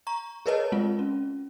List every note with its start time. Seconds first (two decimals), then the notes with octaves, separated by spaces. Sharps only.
0.07 A#5 C#6
0.46 G#4 A#4 B4 C#5 D#5 A5
0.72 G#3 C4 F4
0.99 C#4